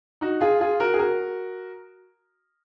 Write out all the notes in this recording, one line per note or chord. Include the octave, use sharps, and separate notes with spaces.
D#4 F#4
F4 G#4
F4 G#4
F#4 A#4
G#4
F#4 A#4